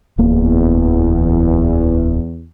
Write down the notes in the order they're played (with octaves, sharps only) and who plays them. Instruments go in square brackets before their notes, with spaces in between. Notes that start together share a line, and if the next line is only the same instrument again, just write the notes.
[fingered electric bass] D1 A#3 [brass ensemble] E2